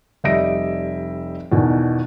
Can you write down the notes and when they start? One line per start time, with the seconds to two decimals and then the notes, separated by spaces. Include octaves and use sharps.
0.24 F1 G3 D#5 E5 A#6 D7
1.52 E2 B2 D#3 D4